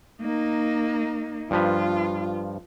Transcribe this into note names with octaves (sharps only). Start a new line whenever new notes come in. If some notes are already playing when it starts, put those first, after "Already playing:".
A#3 D#4
G2 F3 F4 B4